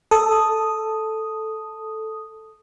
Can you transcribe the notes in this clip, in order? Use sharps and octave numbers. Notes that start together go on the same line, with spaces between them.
A4 D#6